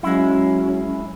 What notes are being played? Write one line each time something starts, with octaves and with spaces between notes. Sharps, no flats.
F#3 G#3 C#4 E4